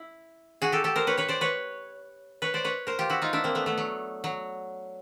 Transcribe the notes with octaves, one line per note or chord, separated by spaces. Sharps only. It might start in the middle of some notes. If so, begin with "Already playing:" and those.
Already playing: E4
F#4 G#4
G4 A4
G4 A4
A#4 C5
B4 C#5
B4 C#5
C5 D5
B4 C#5
B4 C#5
C5 D5
B4 C#5
A#4 C5
F4 G4
E4 F#4
D#4 F4
D4 E4
A#3 C4
A3 B3
A3 B3
F#3
F#3